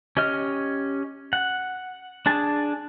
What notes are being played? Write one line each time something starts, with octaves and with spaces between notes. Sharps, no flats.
C#4 G4 D#5 F6
F#5
D4 G#4 A5